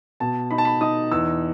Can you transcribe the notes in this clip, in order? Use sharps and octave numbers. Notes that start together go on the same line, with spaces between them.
B2 A5
D#4 B5
A5
B5
D#4 D#6
E2 E6